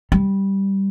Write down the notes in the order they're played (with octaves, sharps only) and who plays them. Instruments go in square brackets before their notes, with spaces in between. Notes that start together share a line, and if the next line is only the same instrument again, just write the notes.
[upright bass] G3